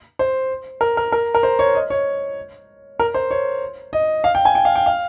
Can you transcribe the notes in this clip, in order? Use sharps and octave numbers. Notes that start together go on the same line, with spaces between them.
C5
A#4
A#4
A#4
A#4
C5
C#5
D#5
C#5
A#4
C5
C#5
D#5
F5
G5
G#5
G5
F5
G5
F5